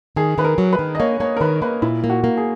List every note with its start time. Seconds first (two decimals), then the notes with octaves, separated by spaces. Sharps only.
0.16 D#3 G#4
0.38 D#3 B4
0.44 A#4
0.58 F#3
0.73 B4
0.79 D#3
0.95 D#5
0.99 A#3 C#5
1.20 A#3 C#5
1.37 A#4
1.41 D#3 B4
1.62 A#3 B4
1.82 A#2 E4
2.04 A#3
2.10 F#4
2.24 A#3
2.37 G#4